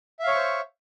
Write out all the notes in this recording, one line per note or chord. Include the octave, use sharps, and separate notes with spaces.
C5 C#5 E5 F5 C#6